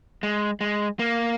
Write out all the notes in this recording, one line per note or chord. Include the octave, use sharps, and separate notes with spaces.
G#3
G#3
A#3